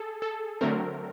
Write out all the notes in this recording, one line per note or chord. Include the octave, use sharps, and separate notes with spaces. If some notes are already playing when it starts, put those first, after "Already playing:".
Already playing: G#4 A4
A4
D3 F#3 A3 C4 A#4